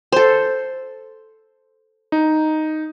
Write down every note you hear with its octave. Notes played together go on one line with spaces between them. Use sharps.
A4 C5
D#4